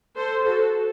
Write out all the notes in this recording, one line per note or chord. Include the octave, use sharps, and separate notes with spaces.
A4 C5
F#4 A4